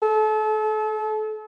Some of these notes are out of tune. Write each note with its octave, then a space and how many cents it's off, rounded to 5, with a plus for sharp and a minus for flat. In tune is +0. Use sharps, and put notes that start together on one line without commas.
A4 -35